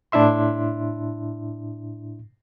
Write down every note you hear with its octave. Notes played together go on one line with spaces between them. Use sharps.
A2 D4 E4 E5 C6